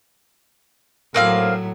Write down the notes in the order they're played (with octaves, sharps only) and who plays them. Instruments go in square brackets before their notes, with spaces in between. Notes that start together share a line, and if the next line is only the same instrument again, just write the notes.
[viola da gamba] A2 F#3 [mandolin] A#3 C4 F5